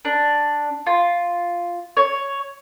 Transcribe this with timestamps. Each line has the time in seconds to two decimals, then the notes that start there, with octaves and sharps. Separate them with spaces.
0.05 D4
0.86 F4
1.97 C#5